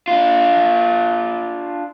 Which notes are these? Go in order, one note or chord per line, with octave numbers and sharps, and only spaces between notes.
D4 F4